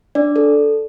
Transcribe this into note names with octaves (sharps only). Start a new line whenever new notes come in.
D4 D5
A4